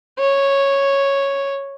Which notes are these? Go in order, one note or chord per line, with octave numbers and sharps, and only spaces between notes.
C#5